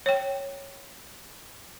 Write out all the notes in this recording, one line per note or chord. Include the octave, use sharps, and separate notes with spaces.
C#5 G5